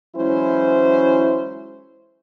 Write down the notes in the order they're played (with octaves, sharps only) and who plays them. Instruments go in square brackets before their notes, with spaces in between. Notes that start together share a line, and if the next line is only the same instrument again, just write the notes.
[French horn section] E3 F#3 G#3 C#4 E4 C5